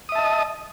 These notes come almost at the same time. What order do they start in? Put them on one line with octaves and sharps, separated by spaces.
D#6 E5 A5 D#5